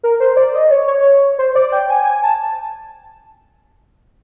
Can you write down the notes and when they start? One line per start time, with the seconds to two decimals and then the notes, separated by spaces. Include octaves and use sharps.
0.03 A#4
0.20 C5
0.36 D5
0.54 D#5
0.71 C#5
0.88 C#5
1.39 C5
1.55 D5
1.72 G5
1.89 G#5
2.05 G#5
2.23 A5